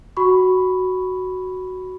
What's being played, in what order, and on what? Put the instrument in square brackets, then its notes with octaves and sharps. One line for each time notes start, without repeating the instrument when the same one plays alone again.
[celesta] F#4 B5 C#6